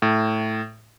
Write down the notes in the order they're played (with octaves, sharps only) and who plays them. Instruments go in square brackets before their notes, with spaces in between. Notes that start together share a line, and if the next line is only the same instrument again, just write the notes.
[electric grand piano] A2